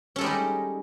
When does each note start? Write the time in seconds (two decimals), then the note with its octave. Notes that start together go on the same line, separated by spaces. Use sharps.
0.16 C#4
0.18 A4
0.21 G#3
0.24 G3
0.26 D#4